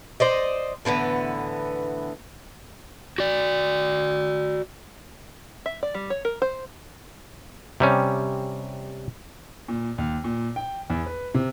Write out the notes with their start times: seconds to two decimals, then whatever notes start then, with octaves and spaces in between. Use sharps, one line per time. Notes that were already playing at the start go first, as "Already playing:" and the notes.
0.20 C5 D5 D#5
0.85 A2 D3 E3 B3
3.18 F#4 D5
5.66 E5
5.83 D5
5.94 G3
6.10 C#5
6.25 A#4
6.42 C5
7.80 C3 G3 C#4
9.68 A#2
9.98 D#2
10.24 A#2
10.56 G5
10.90 E2
11.06 B4
11.35 C3